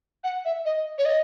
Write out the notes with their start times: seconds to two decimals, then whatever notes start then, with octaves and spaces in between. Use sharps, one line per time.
0.24 F#5
0.45 E5
0.65 D#5
0.98 C#5
1.05 D#5